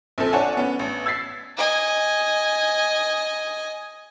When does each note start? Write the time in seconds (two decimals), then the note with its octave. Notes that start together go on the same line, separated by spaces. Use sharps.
0.18 A#1 C4 A4
0.32 D4 C#5 F#5 G#5 A5
0.57 B3 C#4
0.79 A1
1.06 E6 G#6 A6 B6 C7
1.57 D#5 G#5